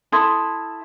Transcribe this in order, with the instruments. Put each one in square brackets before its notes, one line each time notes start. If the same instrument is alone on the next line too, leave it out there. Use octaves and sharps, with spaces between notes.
[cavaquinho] E4 A4 C6 D#6